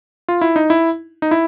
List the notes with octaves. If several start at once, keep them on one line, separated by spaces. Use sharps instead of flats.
F4
E4
D#4
E4
D#4
E4